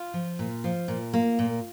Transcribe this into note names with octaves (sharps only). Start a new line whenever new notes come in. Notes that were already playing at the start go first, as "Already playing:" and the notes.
Already playing: F4
F3
A#2
F3
A#2
A#3
A#2